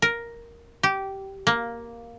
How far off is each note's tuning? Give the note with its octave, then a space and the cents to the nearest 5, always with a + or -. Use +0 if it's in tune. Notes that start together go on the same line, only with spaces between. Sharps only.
A#4 +5
G4 -15
A#3 +5